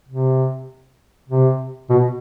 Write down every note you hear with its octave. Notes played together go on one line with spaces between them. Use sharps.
C3
C3
B2